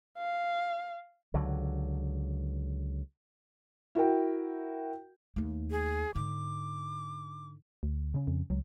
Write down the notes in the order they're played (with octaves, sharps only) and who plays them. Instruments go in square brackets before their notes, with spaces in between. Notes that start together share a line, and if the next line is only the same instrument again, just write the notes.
[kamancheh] F5
[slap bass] C#2 D3 F#3
[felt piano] E4 F#4 A#4 G5
[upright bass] D#2 A3
[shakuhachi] G#4
[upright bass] G#2 D3 [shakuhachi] D6
[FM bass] D2
[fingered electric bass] C#3 C#4
[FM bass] F2
[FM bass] C#2 [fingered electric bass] F#3